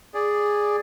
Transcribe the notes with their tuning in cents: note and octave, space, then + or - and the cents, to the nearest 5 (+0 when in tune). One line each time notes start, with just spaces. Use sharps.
G#4 -5 D5 +0